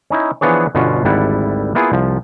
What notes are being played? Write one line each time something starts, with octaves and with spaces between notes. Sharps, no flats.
C#4 D#4 E4
E3 F3 B3 D4 G#4 C#5
G1 B2 D3 C#4 F4 F#4
G#1 D2 G3 E4 A4 F#5
A#3 B3 E4 F4 G#4
C2 F3